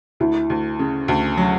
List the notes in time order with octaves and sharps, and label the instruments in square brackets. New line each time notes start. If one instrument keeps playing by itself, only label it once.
[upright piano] D2 [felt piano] E4
[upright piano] D2
C#3
D2
F#3